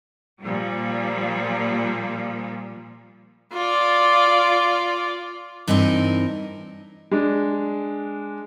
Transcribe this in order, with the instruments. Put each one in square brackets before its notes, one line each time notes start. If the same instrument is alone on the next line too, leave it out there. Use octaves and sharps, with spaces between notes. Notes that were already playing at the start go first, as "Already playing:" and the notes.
[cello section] A#2 F3 G3
[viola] F4 D5
[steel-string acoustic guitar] G2 E3 C4 D#4 F#4 A#4
[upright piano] G#3 D4